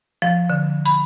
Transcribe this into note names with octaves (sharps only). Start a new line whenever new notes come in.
F3
D3
B5